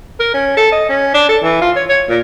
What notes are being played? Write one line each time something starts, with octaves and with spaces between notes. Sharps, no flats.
A#4
C#4
A4
D#5
C#4
D4
A4
E3
F4
C#5
C#5
A#2